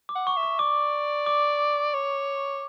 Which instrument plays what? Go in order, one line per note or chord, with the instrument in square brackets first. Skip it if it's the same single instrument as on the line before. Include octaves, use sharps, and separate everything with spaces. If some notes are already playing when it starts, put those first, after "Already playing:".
[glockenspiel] D6
[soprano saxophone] F#5
[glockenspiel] C#6
[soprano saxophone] E5
[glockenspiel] C#6
[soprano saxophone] D5 [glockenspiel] D6
[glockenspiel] D6
[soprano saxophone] C#5